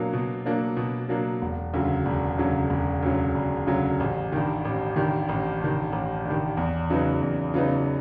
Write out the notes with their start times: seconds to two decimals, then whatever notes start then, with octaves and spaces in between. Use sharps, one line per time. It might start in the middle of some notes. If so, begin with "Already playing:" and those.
Already playing: B2 F#3 A#3 D4
0.13 B2
0.46 F#3 A#3 D4
0.77 B2
1.09 F#3 A#3 D4
1.42 E1
1.74 D2 C#3 F#3
2.06 E1
2.39 D2 C#3 F#3
2.70 E1
3.03 D2 C#3 F#3
3.35 E1
3.67 D2 C#3 F#3
4.00 A1
4.32 G2 D#3
4.65 A1
4.96 G2 D#3
5.29 A1
5.61 G2 D#3
5.93 A1
6.25 G2
6.30 D#3
6.57 E2
6.90 C#3 F#3 B3 D#4
7.22 E2
7.54 C#3 F#3 B3 D#4